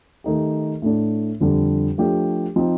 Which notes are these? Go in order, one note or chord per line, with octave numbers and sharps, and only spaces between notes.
D#3 A3 D#4 G4
A2 A3 D4
F2 D3 G3 D4
F3 A3 D4 G4
F3 C4 D#4